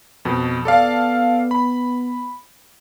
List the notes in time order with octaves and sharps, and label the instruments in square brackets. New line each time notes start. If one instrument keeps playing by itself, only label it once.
[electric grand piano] F2 B2
[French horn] B3 [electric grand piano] A4 D5 F5
[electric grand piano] B5